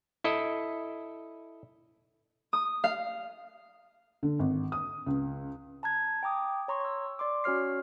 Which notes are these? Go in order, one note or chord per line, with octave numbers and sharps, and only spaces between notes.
E4 A4 D#5
D#6
F5
D3
G#1
D#6
C#2
A5 A#5 F#6 G#6
G5 A#5 D6 D#6
C#5 A#5 C6 C#6
C#6 E6
D5 C6 D6
C#4 F#4 C#5 F6 C7